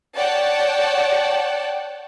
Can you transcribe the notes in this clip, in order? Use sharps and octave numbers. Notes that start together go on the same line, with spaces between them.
C#5 D5 F#5 G5 A5